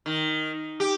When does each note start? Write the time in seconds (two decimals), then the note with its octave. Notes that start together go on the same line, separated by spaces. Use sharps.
0.06 D#3
0.80 G4